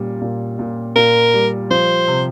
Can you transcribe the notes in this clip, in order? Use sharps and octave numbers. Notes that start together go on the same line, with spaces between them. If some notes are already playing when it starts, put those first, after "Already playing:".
Already playing: A#2 G3 C#4
A#2
A#2
A#2 A#4
G3
F3 C5
C3